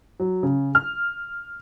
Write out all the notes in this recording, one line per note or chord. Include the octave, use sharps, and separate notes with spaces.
F#3
C#3
F6